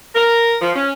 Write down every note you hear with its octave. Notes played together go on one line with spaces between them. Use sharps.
A#4
F3
C#4